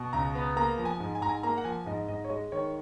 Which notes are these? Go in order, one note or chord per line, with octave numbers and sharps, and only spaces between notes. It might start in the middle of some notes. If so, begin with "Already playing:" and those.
Already playing: B2
C#2 A#5
B3
A#3 A#5
F3
G#5
G#2
G#5
G#2 A#5
G#5
A#3 A#5
F#5
F3 G#5
G#2 D#5
G#2 D#5
C#5
G#3 D#5
D#3 C#5